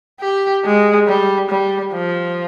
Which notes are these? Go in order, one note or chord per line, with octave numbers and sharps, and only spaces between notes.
G4
G#3
G3
G3
F3